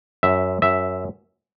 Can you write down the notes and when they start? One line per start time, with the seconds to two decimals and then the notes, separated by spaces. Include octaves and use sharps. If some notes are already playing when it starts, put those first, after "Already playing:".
0.23 F#2 E5
0.62 F#2 E5